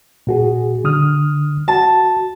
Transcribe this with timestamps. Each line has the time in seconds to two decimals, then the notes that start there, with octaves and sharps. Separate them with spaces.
0.27 A#2 F#4 G#4
0.84 D3 D#6 F6
1.68 F#4 A5